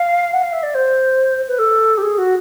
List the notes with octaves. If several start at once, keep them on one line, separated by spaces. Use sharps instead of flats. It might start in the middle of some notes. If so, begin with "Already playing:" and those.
Already playing: F5
F#5
F5
E5
D5
C5
B4
A4
G4
G#4
F#4